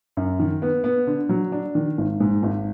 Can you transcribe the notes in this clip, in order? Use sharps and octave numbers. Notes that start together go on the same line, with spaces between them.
F#2
D#3
B3
B3
D3
F#3
D4
D#3
G#1
G#2
G#1